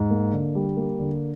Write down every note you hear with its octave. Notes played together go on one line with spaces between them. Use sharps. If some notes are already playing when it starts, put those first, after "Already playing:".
Already playing: G#2
A#3
D3
G3
A#3
D3